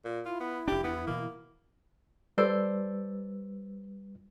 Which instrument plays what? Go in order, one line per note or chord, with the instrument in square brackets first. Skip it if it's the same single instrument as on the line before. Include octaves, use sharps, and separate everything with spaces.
[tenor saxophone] A#2
[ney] E4 [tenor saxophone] F4
[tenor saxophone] B3
[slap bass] F1 D4 [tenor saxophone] G4
[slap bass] E2 [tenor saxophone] B3
[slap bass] B2 E3 [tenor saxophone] A#3
[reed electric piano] G3 B4 E6 [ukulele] A4 C5 D5